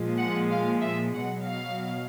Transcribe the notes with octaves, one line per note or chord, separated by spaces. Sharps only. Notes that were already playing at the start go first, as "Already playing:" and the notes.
Already playing: A#2 F3 G#3
F#5
F5
E5
B2 F#3 F#5
F5